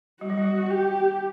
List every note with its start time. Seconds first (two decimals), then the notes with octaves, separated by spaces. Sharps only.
0.21 G3 F#4
0.30 F#3
0.38 G3
0.70 G4